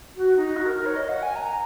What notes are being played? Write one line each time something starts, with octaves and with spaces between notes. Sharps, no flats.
F#4
D#4
F#4
A#4
A#4
C#5
D#5
F#5
G#5
A#5